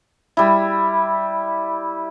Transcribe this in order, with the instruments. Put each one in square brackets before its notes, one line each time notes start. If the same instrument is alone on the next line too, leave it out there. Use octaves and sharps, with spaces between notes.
[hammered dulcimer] G3 E4